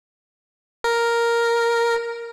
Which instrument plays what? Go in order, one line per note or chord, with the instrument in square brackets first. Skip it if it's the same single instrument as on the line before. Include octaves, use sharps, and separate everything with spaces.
[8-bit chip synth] A#4